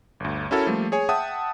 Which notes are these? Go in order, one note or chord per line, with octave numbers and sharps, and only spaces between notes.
G1 D2
C#4 E4 F#4 A4 A#4 C#5
F3 G3 A3 A#3
G#4 C#5 G#5
E5 F#5 G5 A5 D#6